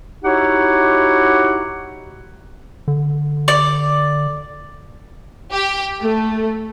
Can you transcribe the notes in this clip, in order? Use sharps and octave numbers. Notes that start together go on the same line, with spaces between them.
D#4 E4 F#4 G4 C#5 F#5
D3
D5
G4
A3